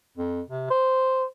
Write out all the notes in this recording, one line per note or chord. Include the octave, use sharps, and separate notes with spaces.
F2
C3
C5